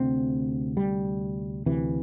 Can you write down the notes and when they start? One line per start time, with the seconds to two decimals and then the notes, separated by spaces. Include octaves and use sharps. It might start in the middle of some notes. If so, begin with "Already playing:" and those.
Already playing: D2 C3 C4
0.77 G3
1.66 D2 C3 E3